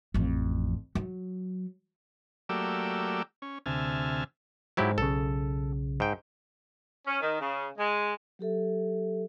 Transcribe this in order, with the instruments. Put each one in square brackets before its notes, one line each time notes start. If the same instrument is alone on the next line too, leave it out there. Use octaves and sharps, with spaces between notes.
[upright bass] A1 F2
F#3
[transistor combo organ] F#3 A3 A#3 G4 D5 E6
C#4
D2 C3 E5 G#5 A5 F6
[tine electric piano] G#2 G#3 C5 [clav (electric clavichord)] F#3 E4 G4
[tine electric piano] B1 C#3 [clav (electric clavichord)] A4
[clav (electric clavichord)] G#2 G5
[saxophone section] C#4
D#3
C#3
G#3
[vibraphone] F#3 G4 A4 E5